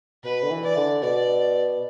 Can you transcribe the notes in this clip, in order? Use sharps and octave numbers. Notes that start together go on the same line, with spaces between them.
B2 B4
D3
E3
D5
D3
B2 D5